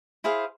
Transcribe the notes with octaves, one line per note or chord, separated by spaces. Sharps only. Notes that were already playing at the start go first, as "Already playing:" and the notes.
E4 G#4 C5 F5